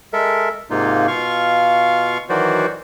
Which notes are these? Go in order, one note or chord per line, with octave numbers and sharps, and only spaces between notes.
G#3 A4 A#4 E5
G#2 C3 A#3 D#4 F4
B2 F4 F5 C#6
D#3 E3 F#3 F#4 C5 D5